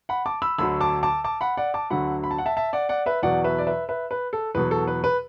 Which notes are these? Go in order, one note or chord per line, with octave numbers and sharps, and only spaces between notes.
F#5 B5
A5 D6
B5 E6
D2 D3 F#3 B5 E6
A5 D6
A5 D6
A5 D6
F#5 B5
D5 F#5
A5 D6
D2 D3 F#3 F#5 B5
B5
A5
F#5
E5 A5
E5 A5
D5 F#5
D5 F#5
B4 E5
E2 B2 F#3 D5 F#5
B4 E5
D5
B4 E5
B4 E5
B4
A4
E2 B2 F#3 B4
A4
B4
B4